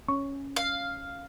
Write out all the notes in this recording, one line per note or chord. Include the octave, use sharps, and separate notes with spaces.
C#4 C#6
F5